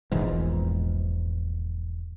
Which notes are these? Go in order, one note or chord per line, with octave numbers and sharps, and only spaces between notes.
E1 A#1 E2 G#2